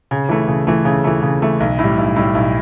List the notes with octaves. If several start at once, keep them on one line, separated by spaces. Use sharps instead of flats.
C#3
E3 A3
C#3
E3 A3
C#3
E3 A3
C#3
E3 A3
B1
A2
G3
B1
A2 G3
B1